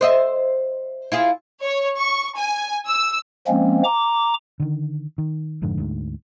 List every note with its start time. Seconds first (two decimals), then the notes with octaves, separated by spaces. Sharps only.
0.01 C5 D#5 E5
1.12 E4 F4 G#4
1.62 C#5
1.98 C#6
2.37 G#5
2.87 E6
3.48 F3 G#3 A#3 C4 C#4
3.84 A#5 D6
4.60 D3 D#3
5.18 D#3
5.62 F1 F2 G#2 D3
5.78 D2 G#2